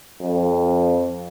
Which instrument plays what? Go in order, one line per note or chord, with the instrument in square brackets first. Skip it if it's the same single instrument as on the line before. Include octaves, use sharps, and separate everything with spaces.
[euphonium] F2